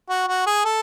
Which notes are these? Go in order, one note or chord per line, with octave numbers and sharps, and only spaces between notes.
F#4
F#4
G#4
A4